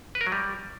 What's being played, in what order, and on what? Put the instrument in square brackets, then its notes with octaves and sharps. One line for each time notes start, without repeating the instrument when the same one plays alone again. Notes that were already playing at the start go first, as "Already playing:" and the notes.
[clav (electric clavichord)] B4
A#4
F#3
G3